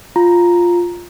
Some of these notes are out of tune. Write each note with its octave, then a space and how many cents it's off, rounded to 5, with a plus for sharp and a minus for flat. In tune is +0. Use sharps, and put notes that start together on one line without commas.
F4 +0 A#5 +0